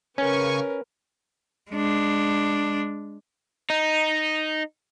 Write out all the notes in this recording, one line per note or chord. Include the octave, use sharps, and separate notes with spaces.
C#3 C#4 A#4 B4 G#5 C#6
G#3 D4
D#4